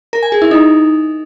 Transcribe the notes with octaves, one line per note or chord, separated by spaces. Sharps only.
A#4
G#5
G#4
E4
D#4